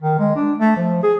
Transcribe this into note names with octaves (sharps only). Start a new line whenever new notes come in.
D#3
G#3
D4
A3
F3
G#4